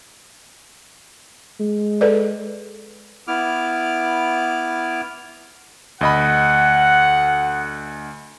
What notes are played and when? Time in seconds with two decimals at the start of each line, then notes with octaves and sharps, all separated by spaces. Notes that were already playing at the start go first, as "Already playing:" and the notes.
1.60 G#3
2.01 A4 B4 D5
3.28 B3 E4 D6 F6
6.01 D2 D#5 F#5 B5